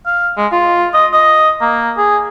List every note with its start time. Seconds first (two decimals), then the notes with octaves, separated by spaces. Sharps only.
0.06 F5
0.37 G#3
0.52 F4
0.94 D#5
1.13 D#5
1.61 A#3
1.98 G#4